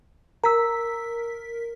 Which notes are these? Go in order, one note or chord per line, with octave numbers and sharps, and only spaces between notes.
A#4 A#5 E6 B6